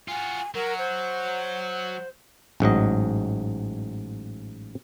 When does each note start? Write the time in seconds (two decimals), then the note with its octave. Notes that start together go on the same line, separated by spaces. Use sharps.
0.08 F4 F#4 G#5
0.55 F#3 A#4 F#5
0.79 C5
2.60 A1 G#2 F#3 D#5